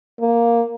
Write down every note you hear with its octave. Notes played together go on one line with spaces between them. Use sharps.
A#3